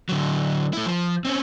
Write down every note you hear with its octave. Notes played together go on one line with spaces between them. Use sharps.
D3 F#3
A3 E4
F3
C4 C#4